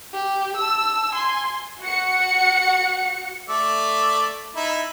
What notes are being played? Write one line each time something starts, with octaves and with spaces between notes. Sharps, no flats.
G4
A5 E6
G#5 C6
F#4 F#5 C#7
A3 D5 E5
D#4 E4 E5